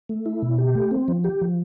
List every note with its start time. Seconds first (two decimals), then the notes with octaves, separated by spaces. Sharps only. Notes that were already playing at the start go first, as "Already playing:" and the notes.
0.09 A3
0.26 E4
0.42 B2
0.58 G4
0.75 A3
0.91 C4
1.08 F3
1.24 G4
1.41 F3